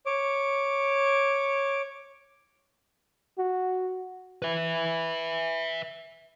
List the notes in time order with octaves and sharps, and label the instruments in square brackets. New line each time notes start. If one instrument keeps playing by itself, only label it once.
[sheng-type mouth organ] C#5 D6
[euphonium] F#4
[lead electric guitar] B4 E5